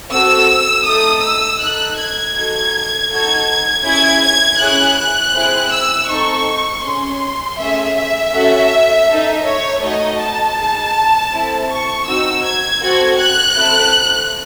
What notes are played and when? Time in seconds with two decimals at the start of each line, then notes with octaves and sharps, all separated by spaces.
0.10 C4 F#4 A4 E6
0.85 A3 D#4 A4 D#6
1.22 E6
1.59 D#4 A4 F#6
1.97 G#6
2.34 D#4 F#4 A4 G#6
3.09 D#4 F#4 A4 G#6
3.84 C#4 E4 G#4 G#6
4.22 G#6
4.58 C#4 E4 G#4 F#6
4.96 F#6
5.33 C4 E4 G#4
5.70 E6
6.08 C4 D#4 A4 C#6
6.83 C#4 G#4 C6
7.58 A3 C#4 G#4 E5
7.95 E5
8.32 C#4 F#4 A4
9.07 D#4 A4
9.45 C#5
9.82 A3 D#4 F#4 D#5
10.19 A5
10.56 D#4 G#4
11.31 C4 E4 A4
11.69 C#6
12.06 C4 D#4 F#4 E6
12.44 G#6
12.81 C4 F#4 A4
13.18 F#6
13.56 C4 E4 A4